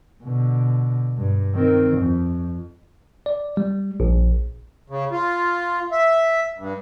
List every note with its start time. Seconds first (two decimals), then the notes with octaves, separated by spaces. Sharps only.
0.23 B2 D3
1.18 G2
1.55 D#3 C4
1.99 F2
3.26 D5
3.57 G3
4.00 A#1
4.90 C#3
5.12 F4
5.92 E5
6.59 G2